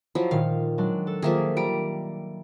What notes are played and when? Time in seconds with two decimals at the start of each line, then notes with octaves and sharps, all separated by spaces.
0.15 F3 F#3 E4
0.31 A#2 D#3 F5
0.78 F#3 G#3 D4
1.07 A4
1.22 D#3 F3 A#3 G#4 E5
1.57 G3 A#5 D7